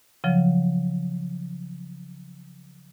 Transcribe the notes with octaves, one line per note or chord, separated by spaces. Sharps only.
C#3 F3 F#3